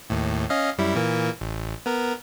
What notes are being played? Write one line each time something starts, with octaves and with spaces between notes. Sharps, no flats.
D#2 A2
C#4 D#5 F5
F#2 G3 E4
A#2 E3 A#3
A1
B3 A#4